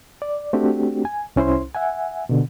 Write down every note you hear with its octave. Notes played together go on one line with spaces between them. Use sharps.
D5
A3 C4 D4 F#4 G4
G#5
C2 C#4 E4 C5 C6
E5 F#5 G#5
B2 D3